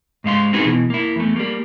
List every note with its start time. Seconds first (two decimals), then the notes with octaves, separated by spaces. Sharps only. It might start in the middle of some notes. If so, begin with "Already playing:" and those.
0.24 G#2 G#3 F5 C6
0.53 C4 D#4 F4 F#4 G#4 B4
0.65 B2 E3
0.90 A#3 E4
1.16 E2 A3
1.36 G3 A#3